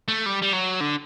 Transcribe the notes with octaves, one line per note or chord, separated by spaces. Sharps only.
A3
G3
G3
F#3
D3